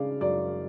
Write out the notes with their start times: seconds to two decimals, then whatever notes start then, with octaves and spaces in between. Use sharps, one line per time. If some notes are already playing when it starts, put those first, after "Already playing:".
Already playing: C#3 D4 D5 F5
0.20 F#2 D5